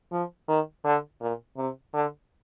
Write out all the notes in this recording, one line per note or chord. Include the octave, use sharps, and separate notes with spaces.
F3
D#3
D3
A#2
C3
D3